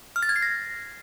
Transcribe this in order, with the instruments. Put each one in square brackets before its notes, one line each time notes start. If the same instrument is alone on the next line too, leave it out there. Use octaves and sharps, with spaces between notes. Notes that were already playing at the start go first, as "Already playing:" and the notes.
[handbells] F6
A6
G#6
C7
A#6